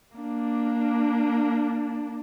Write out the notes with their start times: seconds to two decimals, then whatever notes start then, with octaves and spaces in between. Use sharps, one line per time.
0.17 A#3 D4